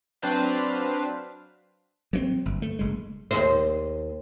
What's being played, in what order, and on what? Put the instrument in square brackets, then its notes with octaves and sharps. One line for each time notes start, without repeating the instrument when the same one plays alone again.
[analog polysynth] F#3 C4 D4 B4 C5 F5
[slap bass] F#3 A3 C4
G1
A3
F#1 G#3
[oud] D#2 A#2 C5